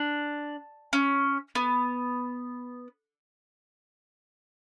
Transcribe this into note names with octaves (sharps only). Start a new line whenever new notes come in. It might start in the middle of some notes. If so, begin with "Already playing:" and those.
Already playing: D4
C#4
B3